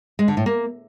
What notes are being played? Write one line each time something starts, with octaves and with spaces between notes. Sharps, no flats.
G#3
D3
A2
A#3